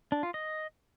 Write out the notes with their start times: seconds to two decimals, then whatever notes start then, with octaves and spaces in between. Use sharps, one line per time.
0.12 D4
0.23 F4
0.34 D#5